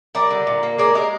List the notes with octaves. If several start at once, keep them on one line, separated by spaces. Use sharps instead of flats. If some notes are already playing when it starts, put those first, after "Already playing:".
G3 A#4 D5
D3
A#2
A#3
G#3 A#4 D5
G#3 G4 A#4